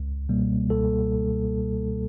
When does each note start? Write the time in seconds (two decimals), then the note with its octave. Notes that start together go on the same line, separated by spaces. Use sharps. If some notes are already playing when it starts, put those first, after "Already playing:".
Already playing: C#2
0.29 B2 G3 A#3
0.70 C#2 A4